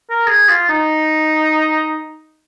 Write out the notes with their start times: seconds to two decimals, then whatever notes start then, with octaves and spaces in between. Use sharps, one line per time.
0.10 A#4
0.27 G#4
0.49 F4
0.69 D#4